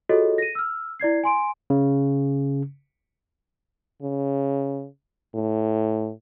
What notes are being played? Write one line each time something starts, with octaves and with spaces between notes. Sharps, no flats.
F4 F#4 G#4 A4 C#5 D#5
A#6 D#7
E6 F6
E4 D5 G#6 C7
G#5 C6 D7
C#3
C#3
A2